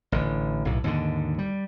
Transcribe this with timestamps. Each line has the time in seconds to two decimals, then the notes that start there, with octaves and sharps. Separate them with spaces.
0.12 A1 D3
0.65 B1 A2
0.84 D#2 G#2 D3
1.38 G3